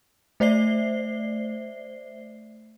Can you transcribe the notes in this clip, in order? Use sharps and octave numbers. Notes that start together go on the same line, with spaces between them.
A3 C5 D5 E5 C7 G7